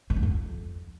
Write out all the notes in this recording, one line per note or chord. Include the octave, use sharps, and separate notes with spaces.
A2
G#2
F2